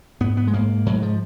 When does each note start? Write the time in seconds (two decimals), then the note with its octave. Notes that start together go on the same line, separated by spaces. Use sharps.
0.21 G#2 B3
0.37 B3
0.47 G#3
0.53 G#2 A#3
0.86 G#2 F#3
1.02 F3